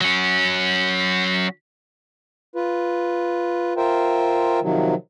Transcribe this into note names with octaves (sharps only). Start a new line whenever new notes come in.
F#3 C#4
F4 B4
F4 A#4 C5 E5 G5
C3 D#3 F3 F#3